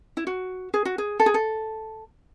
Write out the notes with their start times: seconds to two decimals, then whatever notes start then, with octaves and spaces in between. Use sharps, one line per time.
0.17 E4
0.27 F#4
0.74 G#4
0.85 F#4
0.98 G#4
1.20 A4
1.26 G#4
1.34 A4